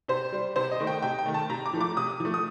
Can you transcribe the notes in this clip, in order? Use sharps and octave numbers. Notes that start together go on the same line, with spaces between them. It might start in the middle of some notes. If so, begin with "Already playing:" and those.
C3 C5
G3
C3 C5
D#5
D#3 A3
G5
C3 G5
G5
D#3 A3
A5
C3 A#5
D6
F3 A3
D6
C3 D#6
F3 A3
D#6